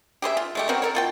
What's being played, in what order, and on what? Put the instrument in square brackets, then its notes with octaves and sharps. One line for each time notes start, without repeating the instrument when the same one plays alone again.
[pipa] G4 G#4 C5 E5
F4
G#3 A3 G4
B3 C4 F#4 A#4
A4 A#4 C#5
B2 F4 G5